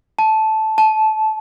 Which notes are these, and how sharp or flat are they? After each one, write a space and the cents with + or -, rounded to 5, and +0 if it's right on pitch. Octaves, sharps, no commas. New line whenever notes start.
A5 -10
A5 -20